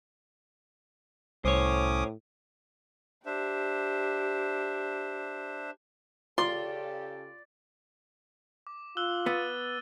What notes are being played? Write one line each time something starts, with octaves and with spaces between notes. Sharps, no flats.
C2 A2 C#4 C5 C#5 D6 D#6
D4 G4 C5 E5
C#3 F4 G4 A4 D5 C6
D6
F4 E6 F#6 G7
B3 E6 A6 D#7